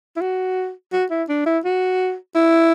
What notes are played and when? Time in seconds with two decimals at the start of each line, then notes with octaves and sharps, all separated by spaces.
0.16 E4
0.21 F#4
0.93 F#4
1.11 E4
1.29 D4
1.46 E4
1.65 F#4
2.35 E4